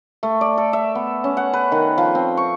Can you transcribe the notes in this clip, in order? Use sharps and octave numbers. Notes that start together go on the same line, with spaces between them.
A3
D5
A4
E5
B3
C#4
F#5
B4
D#3
F3
C4
C#6